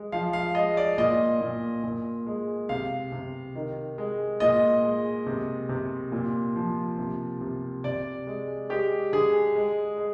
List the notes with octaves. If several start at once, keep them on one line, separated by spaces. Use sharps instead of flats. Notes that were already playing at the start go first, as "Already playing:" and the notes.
Already playing: G#3
F3 F5
F5
G#3 D#5
D5
A#2 D#5
A#2
A#2
G#3
C3 F5
C3
D#3
G#3
A#2 D#5
G#3
C3
C3
A#2
F3
C3
C3
C3 D5
G#3
G#3 G4
D3 G#4
G#3
G#3